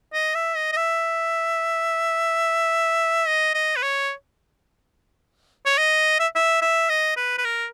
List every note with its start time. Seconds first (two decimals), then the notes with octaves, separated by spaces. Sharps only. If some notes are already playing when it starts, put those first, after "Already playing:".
0.14 D#5
0.35 E5
0.56 D#5
0.72 D#5
0.77 E5
3.27 D#5
3.54 D#5
3.76 B4
3.82 C#5
5.66 C#5
5.78 D#5
6.20 E5
6.35 E5
6.62 E5
6.89 D#5
7.17 B4
7.38 B4
7.45 A#4